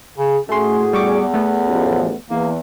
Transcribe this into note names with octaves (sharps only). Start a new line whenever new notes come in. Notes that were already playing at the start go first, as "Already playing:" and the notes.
C#3 G#4
A2 A3 C#4 F#4 G#4 C6
E2 G3 C#6 D6
A3 B3
A1 F#2 F3
E2 A#3